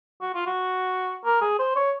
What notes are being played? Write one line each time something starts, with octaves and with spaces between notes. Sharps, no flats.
F#4
F4
F#4
A#4
G#4
C5
C#5